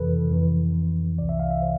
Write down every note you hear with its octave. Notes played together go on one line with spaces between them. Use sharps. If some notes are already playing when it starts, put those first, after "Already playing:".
Already playing: F2 C3 E3 A4 B4
F2 E3
C2 C3 E3 D5
E5
F5
E5
C5